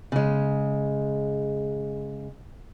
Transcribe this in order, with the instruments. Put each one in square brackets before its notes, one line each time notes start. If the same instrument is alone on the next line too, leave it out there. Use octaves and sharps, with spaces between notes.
[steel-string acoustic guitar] C#3 G#3